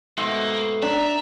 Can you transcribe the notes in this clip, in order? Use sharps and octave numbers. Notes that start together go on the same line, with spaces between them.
G#2 B2 A3 A#3
D4 E5 A#5